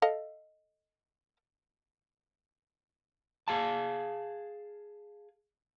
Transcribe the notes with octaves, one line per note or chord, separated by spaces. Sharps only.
A4 D#5 F5
G#4 F5 A5